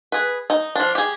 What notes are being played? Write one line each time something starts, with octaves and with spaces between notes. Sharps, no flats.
G#4 B4
D#4
F3 D4
G4 G#4